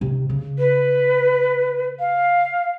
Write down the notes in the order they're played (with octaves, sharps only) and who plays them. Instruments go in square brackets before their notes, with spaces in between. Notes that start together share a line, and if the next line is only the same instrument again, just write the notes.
[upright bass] C3 D#3
C#3
[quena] B4
F5